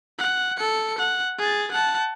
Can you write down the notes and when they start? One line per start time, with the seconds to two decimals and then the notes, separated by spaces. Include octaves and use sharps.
0.18 F#5
0.57 A4 C#7
0.98 F#5
1.38 G#4 A6
1.71 F#5 A5